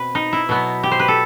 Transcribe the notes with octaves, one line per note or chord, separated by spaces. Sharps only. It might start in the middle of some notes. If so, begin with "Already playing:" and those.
Already playing: B2 C4 B4
D#4
E4
B2 F#3 B3
G4
C5
B4
A4